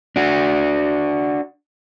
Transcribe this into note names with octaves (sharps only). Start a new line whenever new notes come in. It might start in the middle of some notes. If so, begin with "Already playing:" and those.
D4 F#4